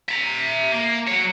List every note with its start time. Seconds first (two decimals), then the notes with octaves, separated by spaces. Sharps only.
0.09 E5 A#5
0.72 A#3
1.08 F#3 C#5